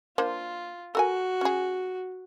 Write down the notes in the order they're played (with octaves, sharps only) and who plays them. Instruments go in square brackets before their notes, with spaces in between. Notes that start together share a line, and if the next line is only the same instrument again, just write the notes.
[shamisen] A#3 D4 C5 [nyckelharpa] F4
[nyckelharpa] F#4 [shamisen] A4 A#4 G#5
[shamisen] C#4 G#4